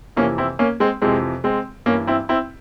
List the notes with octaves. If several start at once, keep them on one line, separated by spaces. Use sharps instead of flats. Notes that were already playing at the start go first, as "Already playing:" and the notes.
F2 C3 E3 A#3 C#4
C4 E4
A#3 C#4
G#3 C4
F2 C3 E3 G#3 C4
G#3 C4
G2 E3 A#3 C#4
C4 E4
C4 E4